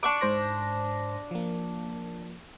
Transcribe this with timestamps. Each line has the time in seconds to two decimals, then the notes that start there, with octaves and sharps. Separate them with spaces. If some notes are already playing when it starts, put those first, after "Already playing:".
0.03 D4 C#6 D6
0.21 G#2 C5 A#6
1.31 F3 A#3